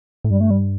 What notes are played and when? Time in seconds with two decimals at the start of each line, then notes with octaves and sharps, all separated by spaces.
0.24 A2
0.30 G2 G3
0.40 A3
0.51 G3